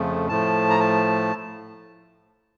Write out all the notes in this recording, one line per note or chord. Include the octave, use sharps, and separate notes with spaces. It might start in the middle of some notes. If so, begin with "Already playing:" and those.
Already playing: F2 C#3 F3 A3
A2 F3 A3 A5
A#5
A5